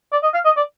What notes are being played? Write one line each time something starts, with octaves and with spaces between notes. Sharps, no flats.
D5
D#5
F5
D#5
D5